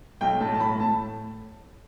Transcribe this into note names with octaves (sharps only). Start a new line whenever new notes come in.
B1 G5
A2 A5
A5
A2 B5
A2 A5